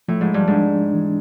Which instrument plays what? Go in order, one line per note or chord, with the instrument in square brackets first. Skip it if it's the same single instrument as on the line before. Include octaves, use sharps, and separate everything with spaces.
[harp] A2 [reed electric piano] F3
[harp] G#2
G2
[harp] G#2 [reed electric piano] D4
[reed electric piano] E3